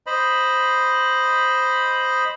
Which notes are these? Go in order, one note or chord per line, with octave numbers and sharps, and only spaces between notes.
C5 D#5 B5